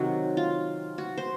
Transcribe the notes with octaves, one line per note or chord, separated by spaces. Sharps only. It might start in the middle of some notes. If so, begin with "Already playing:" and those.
Already playing: C3 D#3 F#3 F#4
F4
F#4
C5